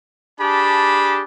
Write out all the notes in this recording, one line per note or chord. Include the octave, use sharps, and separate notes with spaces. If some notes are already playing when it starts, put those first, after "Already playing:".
D4 G4 G#4 A5 B5